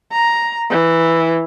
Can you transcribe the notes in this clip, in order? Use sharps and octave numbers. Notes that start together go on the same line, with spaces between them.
A#5
E3